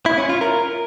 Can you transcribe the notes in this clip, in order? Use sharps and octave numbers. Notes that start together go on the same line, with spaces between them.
E4
C#4
F4
A#4